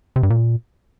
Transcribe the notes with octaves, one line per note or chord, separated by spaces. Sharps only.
C3
G2
A#2